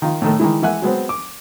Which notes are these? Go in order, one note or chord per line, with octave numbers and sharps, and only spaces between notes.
D#3 F4
A2 D#3 A3
D#3 E3 G#3 E4
E3 G#3 E5 F#5 G#5 F#6
F#3 G#3 B3 C4
D6